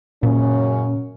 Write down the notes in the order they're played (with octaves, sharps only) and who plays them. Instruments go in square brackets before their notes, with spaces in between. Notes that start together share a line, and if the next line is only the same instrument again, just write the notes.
[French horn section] F#2 C#3 C#4 [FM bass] A#2